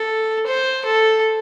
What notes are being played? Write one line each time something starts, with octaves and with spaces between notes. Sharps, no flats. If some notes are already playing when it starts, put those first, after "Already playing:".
Already playing: A4
C5
A4